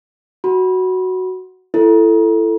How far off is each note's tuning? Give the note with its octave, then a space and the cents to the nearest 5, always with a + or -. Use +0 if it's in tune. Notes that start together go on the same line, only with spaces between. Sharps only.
F#4 +5 B5 -20
E4 +30 A4 +0